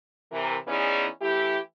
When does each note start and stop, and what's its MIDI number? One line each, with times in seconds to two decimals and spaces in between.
0.32 0.57 48
0.32 0.57 52
0.32 0.57 70
0.68 1.07 52
0.68 1.07 59
0.68 1.07 61
0.68 1.07 63
0.68 1.07 68
0.68 1.07 74
1.22 1.59 52
1.22 1.59 57
1.22 1.59 64
1.22 1.59 67